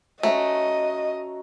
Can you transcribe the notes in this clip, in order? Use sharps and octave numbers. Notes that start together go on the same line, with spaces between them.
A3 C#4 F#4 D#5 A#5